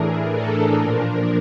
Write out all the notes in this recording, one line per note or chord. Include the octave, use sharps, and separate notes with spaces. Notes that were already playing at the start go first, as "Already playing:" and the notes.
Already playing: A2 E3 A3 D4 G#4 A#4
A4
A#2 F3 A#3 D4 A#4